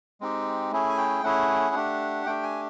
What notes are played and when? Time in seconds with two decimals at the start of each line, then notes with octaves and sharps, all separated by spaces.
0.21 G#3 C4 D#4 G4
0.72 A3 C#4 E4 G#4
0.89 G#5
0.98 G5
1.23 A3 C#4 E4 G#4 F#5
1.75 A3 D4 G4
2.26 A3 D4 G4 G5
2.43 G#5